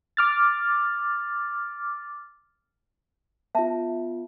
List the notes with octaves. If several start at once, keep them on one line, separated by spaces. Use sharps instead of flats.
D6 F6 A6
B3 F4 E5 A5